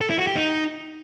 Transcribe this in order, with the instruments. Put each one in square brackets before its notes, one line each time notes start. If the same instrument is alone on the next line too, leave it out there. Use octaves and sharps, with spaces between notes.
[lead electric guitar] A4
E4
F#4
G4
D#4